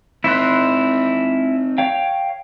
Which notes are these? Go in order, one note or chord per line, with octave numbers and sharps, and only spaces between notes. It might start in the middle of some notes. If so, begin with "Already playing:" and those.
C4 D#4 E4 C6 F#6
C#5 F5 G5